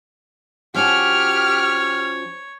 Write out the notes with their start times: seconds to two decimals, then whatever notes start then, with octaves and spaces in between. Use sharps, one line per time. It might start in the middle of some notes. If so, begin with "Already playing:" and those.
0.74 F3 C#4 F#4 G4 C#5 F6